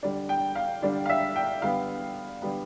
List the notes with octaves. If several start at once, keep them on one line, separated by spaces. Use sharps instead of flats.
D3 G3 D4
G5
F5
D3 G3 D4
F5
E5
G5
D3 G3 B3 F5
D3 G3 B3